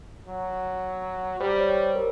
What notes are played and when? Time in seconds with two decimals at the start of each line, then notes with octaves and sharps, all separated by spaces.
0.28 F#3
1.40 G3 C5
1.58 C#5
1.77 C5
1.95 A#4